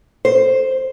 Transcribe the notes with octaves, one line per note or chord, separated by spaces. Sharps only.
C5